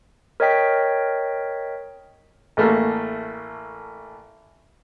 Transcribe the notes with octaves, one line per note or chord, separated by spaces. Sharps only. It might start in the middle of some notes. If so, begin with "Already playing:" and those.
A#4 C#5 D#5 G5 B6
A1 A3 A#3